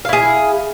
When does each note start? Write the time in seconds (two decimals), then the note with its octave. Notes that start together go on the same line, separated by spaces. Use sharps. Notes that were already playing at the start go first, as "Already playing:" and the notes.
0.05 F5
0.09 E4
0.13 G#4